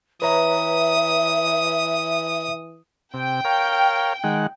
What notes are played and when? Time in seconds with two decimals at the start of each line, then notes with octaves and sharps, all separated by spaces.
0.22 E3 B4 C#5 E5 A#5 D#6
3.14 C3 G5
3.45 A#4 C#5 F5
4.24 D#3 G#3 F#5